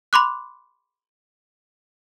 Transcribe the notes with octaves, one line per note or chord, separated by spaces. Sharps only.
B5 C6 D6 F#6